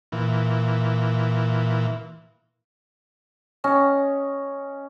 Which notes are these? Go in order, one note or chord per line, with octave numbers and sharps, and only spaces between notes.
A#2 E3
C#4 D#5